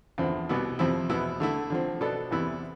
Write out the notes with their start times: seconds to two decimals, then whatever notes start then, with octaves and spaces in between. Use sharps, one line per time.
0.18 E2 D3 F3 C4
0.49 C2 B2 B3 E4
0.79 F2 C3 F3 C4 E4
1.09 E2 B2 B3 E4
1.40 D3 A3 E4
1.70 D3 F3 C4
2.01 B2 B3 D4 A4
2.31 E2 C3 E3 B3 E4